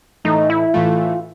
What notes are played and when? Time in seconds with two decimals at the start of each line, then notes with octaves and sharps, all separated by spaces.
0.25 A2 E3 A3 D#4
0.50 E4
0.74 A2 E3 A3 F4